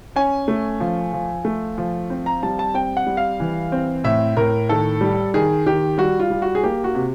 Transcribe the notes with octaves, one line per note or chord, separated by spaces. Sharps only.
C#4 G#5
A3
F3
F3
A3
F3
C4
A#5
G3 A5
A5
C4 G5
F#5
G3
F5
E3
C4
A2 E5
A2 A#4
D#3 A4
G3
D#3 G#4
D#3 G4
G3 F#4
F4
G3
F#4
G#4
A#3 G4
F#4
C3